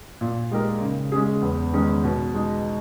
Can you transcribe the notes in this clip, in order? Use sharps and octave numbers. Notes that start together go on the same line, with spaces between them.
A#2
G#3 D#4 G4 A#4
C#3
G#3 C#4 G#4
E2
D#3 G#3 C#4
B2
G#3 D#4